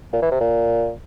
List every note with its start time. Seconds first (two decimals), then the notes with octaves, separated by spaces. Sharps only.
0.13 A#2
0.22 E3
0.31 C3
0.41 A#2